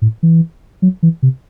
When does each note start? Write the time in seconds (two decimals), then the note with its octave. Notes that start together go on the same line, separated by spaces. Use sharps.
0.02 A2
0.23 E3
0.82 F#3
1.03 E3
1.23 C3